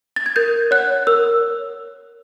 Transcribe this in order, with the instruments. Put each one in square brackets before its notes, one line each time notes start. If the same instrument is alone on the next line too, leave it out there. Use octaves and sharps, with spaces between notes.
[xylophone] A6
G#6
A#4 G6
C#5 F#5 F#6
A#4 E6
C#5